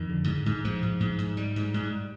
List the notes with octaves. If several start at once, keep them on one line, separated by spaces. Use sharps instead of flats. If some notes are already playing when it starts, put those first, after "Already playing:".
Already playing: F2 D#3
D3
G#2
G#2
G#2 F3
G#2
G#2
G#2
G#2 G3
G#2
G#2